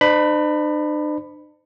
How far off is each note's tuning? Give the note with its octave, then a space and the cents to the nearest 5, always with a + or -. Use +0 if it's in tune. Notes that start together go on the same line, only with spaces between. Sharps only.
D4 +45 C5 -35 B5 +5